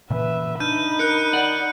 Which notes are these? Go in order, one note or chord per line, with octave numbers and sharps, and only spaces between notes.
A#2 C#3 E3 B4 E5
D4 D#4 B5 F6 G6 D#7
A#4 F#6 C#7
D5 F#5